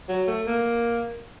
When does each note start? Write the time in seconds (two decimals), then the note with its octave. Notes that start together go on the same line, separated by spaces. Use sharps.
0.09 F#3
0.28 A3
0.47 A#3